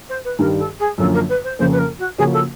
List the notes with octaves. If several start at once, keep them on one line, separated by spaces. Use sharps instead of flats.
C5
B4
G2 D#3 G3 A#4
A4
G#4
F#2 D3 F3 A#3 C#4 A4
A#4
B4
C5
F2 C#3 F3 A#3 C#4 C5
B4
A#4
F#4
C#3 F3 A#3 C#4 F#4 G#4
A4